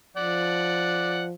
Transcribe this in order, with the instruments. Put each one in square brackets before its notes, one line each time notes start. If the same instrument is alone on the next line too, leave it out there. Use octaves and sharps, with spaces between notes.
[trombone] F3 [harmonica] D5 F#5